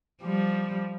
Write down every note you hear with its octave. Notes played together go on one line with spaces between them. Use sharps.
F3 G3